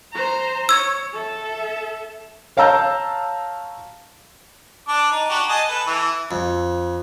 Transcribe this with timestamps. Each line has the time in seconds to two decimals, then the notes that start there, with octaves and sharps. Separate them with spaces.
0.13 C5 A#5
0.69 C#5 E6 G#6
1.14 A4 E5
2.57 C#5 F5 A5 A#5 E6 G6
4.88 D4 D6
5.11 D#4
5.30 D4 F#4 G4
5.48 G#4 D#5 A5
5.69 A4 B4
5.87 E3
6.31 F2